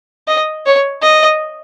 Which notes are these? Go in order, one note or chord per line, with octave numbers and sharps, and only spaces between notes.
D#5
C#5
D#5